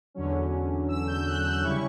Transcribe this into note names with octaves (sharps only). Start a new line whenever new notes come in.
E2 D3 F#3 C#4
E6
G6
F#6
E6
C#3 G3 C#4 E4 C#6